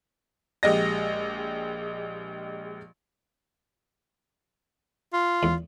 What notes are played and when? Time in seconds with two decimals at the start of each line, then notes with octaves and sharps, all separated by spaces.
0.63 A#1 G#3 G4 D#5 A#6
5.13 F4
5.43 E2